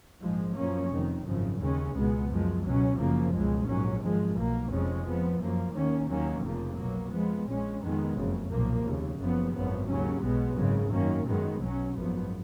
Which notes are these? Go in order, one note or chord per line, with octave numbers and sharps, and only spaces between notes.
A#1 G#2 F3 G#3
F#2 F3 A#3 C#4
F1 F2 D#3
G#1 F#2 C#3 F3
D#2 C#3 G#3 C#4
C#2 B2 G#3 B3
F#2 F3 G#3
C#2 B2 F#3 C#4
F#1 F#2 C#3 F3 A#3
C#2 B2 G#3
A#1 G#2 F#3 C#4
G#1 F#2 F3 G#3
B1 B2 A#3
F1 F2 F3 G#3 C#4
F2 F3 B3
F#2 F3 A#3
D#2 D#3 A#3 C#4
D#2 D#3 F#3 A#3 C#4
F1 F2 C#3 F3 A#3
B1 B2 F#3 A#3
F2 F3 G#3 B3
A#1 A#2 G#3 C#4
F2 D#3 G#3 B3
F#1 F2 C#3
B1 A#2 F3 A#3
F1 D#2 C#3
F#1 F#2 F3 B3
G#1 F#2 F3 B3
D#2 C#3 F#3 C#4
B1 B2 G#3 B3
G#1 F#2 C#3 G#3
F#2 D#3 A#3 C#4
F#2 D#3 G#3 B3
B1 B2 F#3 C#4
G#1 F#2 F3 B3